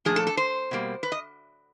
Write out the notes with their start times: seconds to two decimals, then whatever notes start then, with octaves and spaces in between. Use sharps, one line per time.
0.05 A#2 F3 A3 D4 G#4
0.16 A4
0.27 A4
0.37 C5
0.71 B2 G3 A#3
1.03 B4
1.12 D#5